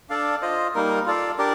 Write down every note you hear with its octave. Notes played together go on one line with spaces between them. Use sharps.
D4 A4 D5 F5
F4 C5 D#5
G3 A#3 D#4 A#4
F4 A4 D5 F5
D4 G4 A#4 D5